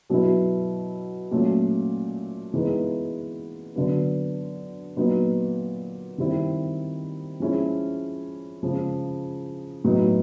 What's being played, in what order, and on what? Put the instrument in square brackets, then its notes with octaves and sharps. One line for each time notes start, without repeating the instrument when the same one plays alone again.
[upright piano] B2 F#3 B3 E4
A#2 F#3 A3 C#4
E3 G#3 B3 D#4
D3 F#3 B3
A#2 F#3 B3 D#4
D#3 G3 C4 E4
F3 G#3 C#4 E4
C#3 F3 G#3
A2 F#3 B3 D#4